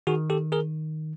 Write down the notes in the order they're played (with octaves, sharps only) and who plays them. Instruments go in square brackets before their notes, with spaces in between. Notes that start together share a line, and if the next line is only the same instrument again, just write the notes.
[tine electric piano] D#3 F#4 G#4
G4 A4
G#4 A#4